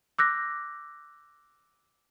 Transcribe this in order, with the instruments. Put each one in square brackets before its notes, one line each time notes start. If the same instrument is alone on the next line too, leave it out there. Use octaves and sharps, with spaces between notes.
[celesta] D6 E6 F#6 G6 A#6